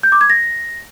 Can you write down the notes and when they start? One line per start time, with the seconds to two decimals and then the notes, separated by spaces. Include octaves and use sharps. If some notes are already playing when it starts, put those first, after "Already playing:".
0.03 G6
0.12 D6
0.21 G#6
0.30 A#6